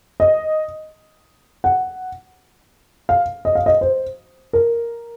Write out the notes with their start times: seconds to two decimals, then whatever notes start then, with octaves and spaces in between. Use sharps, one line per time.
0.20 D#5
1.64 F#5
3.09 F5
3.45 D#5
3.55 F5
3.66 D#5
3.81 C5
4.53 A#4